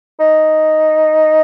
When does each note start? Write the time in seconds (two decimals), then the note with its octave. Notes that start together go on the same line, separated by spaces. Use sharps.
0.20 D#4